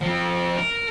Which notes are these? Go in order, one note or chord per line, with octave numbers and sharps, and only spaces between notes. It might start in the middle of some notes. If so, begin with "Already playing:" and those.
F3 C4
A#4